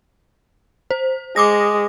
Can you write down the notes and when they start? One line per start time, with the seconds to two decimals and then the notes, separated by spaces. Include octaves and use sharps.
0.91 C5
1.36 G#3 D6 D#6 A#6